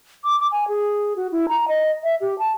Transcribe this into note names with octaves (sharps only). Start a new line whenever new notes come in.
D6
D6
G#5
G#4
F#4
E4
A#5
D#5
E5
G4
A5